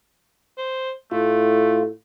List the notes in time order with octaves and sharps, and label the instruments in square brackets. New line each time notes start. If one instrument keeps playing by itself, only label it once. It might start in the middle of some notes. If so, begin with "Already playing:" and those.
[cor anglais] C5
[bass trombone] A2 [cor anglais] A3 [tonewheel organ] F4